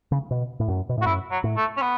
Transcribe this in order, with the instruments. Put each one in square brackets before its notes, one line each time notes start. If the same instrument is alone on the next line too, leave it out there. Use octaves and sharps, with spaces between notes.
[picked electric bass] C#3
B2
A2
F#2
B2
A2
[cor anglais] F#4
[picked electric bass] F#2 [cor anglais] E4
[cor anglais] F#3
[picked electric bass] A2
[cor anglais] A3
C#4
B3